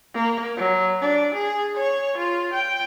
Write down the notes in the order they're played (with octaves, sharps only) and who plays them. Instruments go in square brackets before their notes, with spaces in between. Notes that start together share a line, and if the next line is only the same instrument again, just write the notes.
[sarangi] A#3
F#3
D4
G#4
C#5
F4
G5